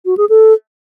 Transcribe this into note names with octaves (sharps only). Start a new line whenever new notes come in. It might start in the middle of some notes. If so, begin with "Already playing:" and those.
F#4
G#4
A4